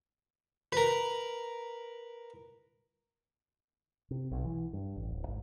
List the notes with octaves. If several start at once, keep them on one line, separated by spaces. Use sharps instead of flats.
A#4 B4
C3
B1
E3
G2
A1
D1
G#1